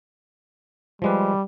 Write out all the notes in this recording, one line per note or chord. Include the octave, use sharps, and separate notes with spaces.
F3 G3 G#3 B4